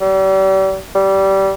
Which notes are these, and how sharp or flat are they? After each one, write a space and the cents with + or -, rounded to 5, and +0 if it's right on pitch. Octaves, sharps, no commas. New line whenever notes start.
G3 -35
G3 -20